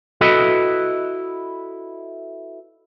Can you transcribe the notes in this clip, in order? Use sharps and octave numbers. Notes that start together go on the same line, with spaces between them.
E4 F#4 A4 B4 D#5 E5